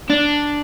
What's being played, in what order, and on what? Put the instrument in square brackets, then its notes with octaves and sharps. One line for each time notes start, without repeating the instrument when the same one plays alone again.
[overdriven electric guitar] D4